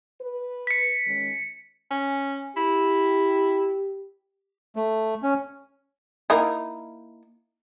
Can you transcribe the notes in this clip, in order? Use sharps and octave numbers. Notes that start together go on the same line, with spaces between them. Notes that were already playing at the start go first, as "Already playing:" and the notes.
B4
B6 C#7
D#3 G#3 C#4
C#4
E4 G4
A3
C#4
A#3 D#4 E4